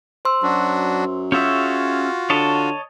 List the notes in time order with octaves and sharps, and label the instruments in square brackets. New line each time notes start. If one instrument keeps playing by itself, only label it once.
[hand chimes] C5 C6 E6
[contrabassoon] F#2 [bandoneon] F#3 D4 F#4
[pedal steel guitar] C#4 G#4 E5 [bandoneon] F4 F#4 [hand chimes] G6
[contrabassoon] D3 [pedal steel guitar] C#5 D#5 A5